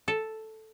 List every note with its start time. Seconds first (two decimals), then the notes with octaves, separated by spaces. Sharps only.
0.08 A4